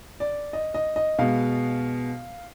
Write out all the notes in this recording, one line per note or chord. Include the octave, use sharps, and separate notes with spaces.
D5
D#5
D#5
D#5
B2 G#3 B3 F5